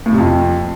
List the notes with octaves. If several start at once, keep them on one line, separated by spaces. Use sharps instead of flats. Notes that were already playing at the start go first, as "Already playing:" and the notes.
A2
C3
F2